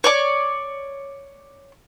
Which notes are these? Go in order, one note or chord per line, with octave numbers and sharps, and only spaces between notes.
C#5 D5 D6